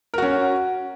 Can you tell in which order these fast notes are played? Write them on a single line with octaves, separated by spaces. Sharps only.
A#4 F#4 C#4